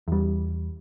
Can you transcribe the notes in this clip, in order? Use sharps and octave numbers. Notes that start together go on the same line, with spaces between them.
E2 G3